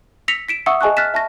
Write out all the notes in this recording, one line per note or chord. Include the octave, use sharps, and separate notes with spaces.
E6 A#6 B6 C#7 F7
B6 D7 E7
E5 F#5 C#6 D#6 E6 C#7
G#4 D#5 G#5 A5 C#6 F#6
F6 F#6 A6 B6 E7
E5 A5 C#6 A#6